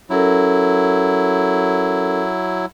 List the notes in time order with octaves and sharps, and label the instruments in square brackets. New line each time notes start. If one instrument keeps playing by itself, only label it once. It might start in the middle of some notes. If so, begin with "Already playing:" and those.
[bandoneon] F#3 E4 [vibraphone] C#4 A4 A#4